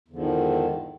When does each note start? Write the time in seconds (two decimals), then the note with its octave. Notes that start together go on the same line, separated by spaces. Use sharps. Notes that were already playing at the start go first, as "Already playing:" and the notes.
0.08 E2
0.11 D3
0.13 F3
0.16 G#2
0.18 D#3